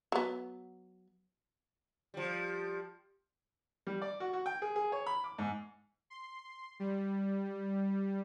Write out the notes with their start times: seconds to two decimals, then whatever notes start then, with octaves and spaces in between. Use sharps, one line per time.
0.12 F#3 B3
2.14 F3 G3
3.87 G3
4.02 D5
4.20 F#4
4.33 F#4
4.46 G5
4.62 G#4
4.76 G#4
4.92 C#5
5.06 B5
5.24 D6
5.38 G#2
6.10 C6
6.80 G3